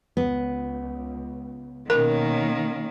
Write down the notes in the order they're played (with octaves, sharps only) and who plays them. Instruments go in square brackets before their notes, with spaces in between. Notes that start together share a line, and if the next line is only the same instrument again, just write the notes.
[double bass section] C#2 [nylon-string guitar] B3
[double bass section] B2 C#4 [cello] D#3 A#3 [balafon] A#4